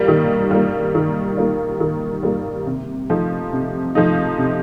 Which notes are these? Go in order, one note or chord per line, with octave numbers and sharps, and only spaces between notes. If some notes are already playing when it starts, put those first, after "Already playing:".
Already playing: G3 A#3
D#3
G3 A#3
D#3
G3 A#3
D#3
G3 A#3
C3
F3 A3 D#4
C3
F3 A3 D#4
C3